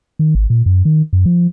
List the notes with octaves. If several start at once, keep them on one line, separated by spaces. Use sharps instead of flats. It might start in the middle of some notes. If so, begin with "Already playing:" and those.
D#3
G#1
A#2
F#2
D#3
F#2
F3